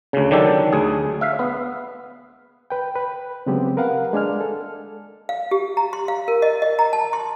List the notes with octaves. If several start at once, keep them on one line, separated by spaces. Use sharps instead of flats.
D2 C#3
D3 D#3 F#3 D4 G4 A4
D2 G#4
E5 F5
B3
B4 G5
B4
C#3 F#3 G#3 B3 C4 G4
A#4 B4 F5 F#5
G#3 D4 G#5 F6
A4
F5
G4
A#5
C6
F5
A#4
D#5
D#5
A#5
A5
C6